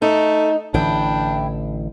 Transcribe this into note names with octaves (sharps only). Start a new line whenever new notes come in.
A3 D#4
A1 D3 E3 D4 E4 G5